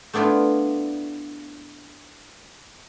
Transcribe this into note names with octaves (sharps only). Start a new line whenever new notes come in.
A3 B3 D4 E4 F4